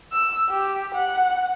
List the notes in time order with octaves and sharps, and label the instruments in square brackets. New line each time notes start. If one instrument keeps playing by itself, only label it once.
[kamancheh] E6
G4
F#5